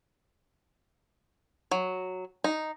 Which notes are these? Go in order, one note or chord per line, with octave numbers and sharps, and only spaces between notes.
F#3
D#4